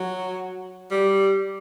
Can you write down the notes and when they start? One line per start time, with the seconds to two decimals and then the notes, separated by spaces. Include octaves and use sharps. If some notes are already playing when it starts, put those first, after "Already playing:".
Already playing: F#3
0.91 G3